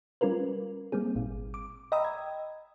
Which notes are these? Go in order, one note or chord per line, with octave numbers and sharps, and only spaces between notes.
G3 C#4 F4 A#4 B4
G3 A#3 C4 G#4
G#1 A#2
D6
D#5 G5 A#5 B5 D#6 E6
G#6